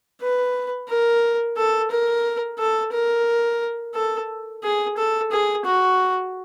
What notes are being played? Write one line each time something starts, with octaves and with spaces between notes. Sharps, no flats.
B4
A#4
A4
A#4
A4
A#4
A4
G#4
A4
G#4
F#4